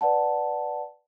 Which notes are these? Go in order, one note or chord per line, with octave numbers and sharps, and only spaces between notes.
B4 D5 F#5 A5